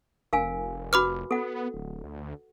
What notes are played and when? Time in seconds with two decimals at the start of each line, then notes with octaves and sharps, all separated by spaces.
0.33 F1 A#4 F5 G#5
0.93 F#4 B4 B5 D6 F6
1.31 B3 A4 F#5
1.74 D1
2.04 D2